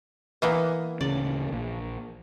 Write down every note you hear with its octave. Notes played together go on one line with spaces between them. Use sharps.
E3 A#3 B3
D1 C#3 C#4 D5
A#1